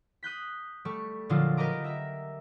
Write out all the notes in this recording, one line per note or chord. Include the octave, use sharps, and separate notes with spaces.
D#6 F#6 G6 B6
G3 A3 C#6
A#2 D3 F3 F#3 D4 F4
G4 A#4 B4 D#5 A#5 D6
E5 A#5